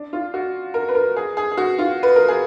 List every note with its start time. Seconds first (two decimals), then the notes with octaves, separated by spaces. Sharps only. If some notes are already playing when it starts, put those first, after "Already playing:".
Already playing: D4
0.13 F4
0.34 F#4
0.74 A#4
0.88 B4
0.95 A#4
1.16 G#4
1.37 G#4
1.51 G#4
1.57 F#4
1.79 F4
2.03 B4
2.16 A#4
2.28 G#4